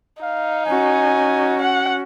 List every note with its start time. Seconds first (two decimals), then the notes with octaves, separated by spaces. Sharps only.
0.23 D#4 F5
0.66 C#4 F#4 G#5
1.62 F#5